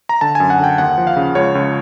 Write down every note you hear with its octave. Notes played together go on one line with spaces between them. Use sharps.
A#5
D3 A5
F#2 G#5
F#5
D3 G5
D#2 F#5
F3
F5
C#3
C#2 C#5
C#2